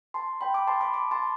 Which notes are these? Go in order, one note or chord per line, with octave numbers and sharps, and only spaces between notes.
A5 C6
G5 B5
B5 D6
A5 C6
B5 D6
B5 D6
A5 C6